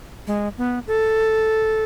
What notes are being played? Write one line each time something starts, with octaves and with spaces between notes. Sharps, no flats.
G#3
B3
A4